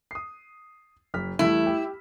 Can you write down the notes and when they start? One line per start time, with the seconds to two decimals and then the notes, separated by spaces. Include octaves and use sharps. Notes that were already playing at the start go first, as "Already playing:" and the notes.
0.11 D#6 C7
1.14 F#1 F6 B6
1.39 E2 G3 A3 E4
1.66 G4